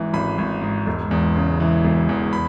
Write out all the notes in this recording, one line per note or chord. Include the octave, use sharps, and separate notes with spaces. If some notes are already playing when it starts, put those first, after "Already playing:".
Already playing: G#1 G#2 E3
G#1 B5
G#1
G#2
E1
E2
C#3
E3
E1
E2
B5